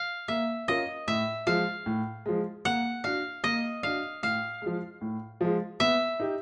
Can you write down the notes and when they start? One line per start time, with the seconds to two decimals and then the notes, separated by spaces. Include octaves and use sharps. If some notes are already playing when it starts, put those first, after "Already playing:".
Already playing: F5
0.28 A#3 E5
0.68 C#4 F4 A#4 D#5
1.08 A2 E5
1.47 F3 G#3 F5
1.86 A2
2.26 F3 G#3
2.65 A#3 F#5
3.04 D4 F#4 F5
3.44 A#3 D#5
3.83 D4 F#4 F5
4.23 A2 F5
4.62 F3 G#3
5.01 A2
5.41 F3 G#3
5.80 B3 E5
6.20 D#4 G4